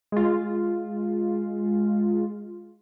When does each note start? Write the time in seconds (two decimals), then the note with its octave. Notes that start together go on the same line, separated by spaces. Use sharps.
0.12 G#3 F4